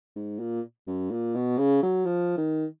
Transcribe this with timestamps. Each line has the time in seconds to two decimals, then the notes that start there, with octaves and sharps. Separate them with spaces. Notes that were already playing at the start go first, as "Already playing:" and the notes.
0.16 G#2
0.40 A#2
0.87 F#2
1.11 A#2
1.35 B2
1.58 C#3
1.83 F#3
2.05 F3
2.37 D#3